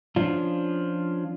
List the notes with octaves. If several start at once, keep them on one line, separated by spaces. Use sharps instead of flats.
F3 C#4 D4 F4